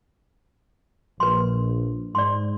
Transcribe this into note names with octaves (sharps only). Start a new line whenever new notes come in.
A#1 B4 C6
G#2 D5 C6